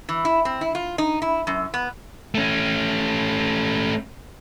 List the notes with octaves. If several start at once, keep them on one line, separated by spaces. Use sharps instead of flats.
E3
E4
C4
E4
F4
D#4
E4
F#2
B3
A3 C#4